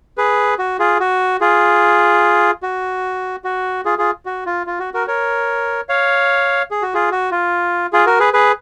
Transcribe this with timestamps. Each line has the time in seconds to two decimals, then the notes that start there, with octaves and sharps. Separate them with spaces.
0.18 G#4 B4
0.59 F#4
0.79 F4 G#4
1.00 F#4
1.41 F4 G#4
2.63 F#4
3.44 F#4
3.85 F4 G#4
3.98 F4 G#4
4.26 F#4
4.46 F4
4.67 F4
4.80 F#4
4.94 F#4 A#4
5.07 A#4 C#5
5.89 C#5 F5
6.71 G#4
6.82 F#4
6.94 F4 G#4
7.12 F#4
7.31 F4
7.93 F4 G#4
8.06 F#4 A#4
8.19 G#4 B4
8.33 G#4 B4